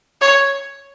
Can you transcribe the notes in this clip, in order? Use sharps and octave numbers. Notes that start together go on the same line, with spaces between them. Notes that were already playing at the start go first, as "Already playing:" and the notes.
C#5